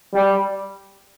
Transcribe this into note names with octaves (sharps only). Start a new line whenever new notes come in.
G3